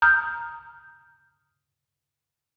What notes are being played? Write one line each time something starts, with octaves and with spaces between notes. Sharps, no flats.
A#5 D#6 F6 G6